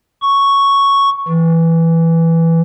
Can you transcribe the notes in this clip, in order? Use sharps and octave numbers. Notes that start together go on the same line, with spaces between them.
C#6
E3